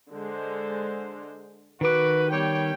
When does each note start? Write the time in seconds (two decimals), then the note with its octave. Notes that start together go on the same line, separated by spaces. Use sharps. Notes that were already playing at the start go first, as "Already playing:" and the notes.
0.10 D3 G#3 C5
1.81 D#3 F#4 B4 D6
2.30 G3 B3 C#5 G5